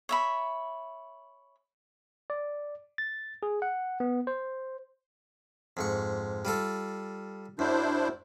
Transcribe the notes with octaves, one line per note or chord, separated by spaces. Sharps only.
C#5 E5 B5
D5
A6
G#4
F#5
B3
C5
F2 G#2 C#6
G3 F4 A4
F#2 D4 E4 C5